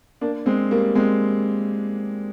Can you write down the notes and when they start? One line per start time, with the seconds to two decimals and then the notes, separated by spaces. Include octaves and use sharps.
0.21 A#3 D4
0.46 G#3 C4
0.71 G3 A#3
0.95 G#3 C4